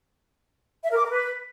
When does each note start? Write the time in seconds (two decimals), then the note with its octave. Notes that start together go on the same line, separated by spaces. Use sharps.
0.84 E5
0.91 A#4
0.97 D6
1.04 A#4
1.10 B4